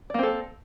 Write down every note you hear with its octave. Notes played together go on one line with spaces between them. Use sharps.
A#3 C4 A4 D5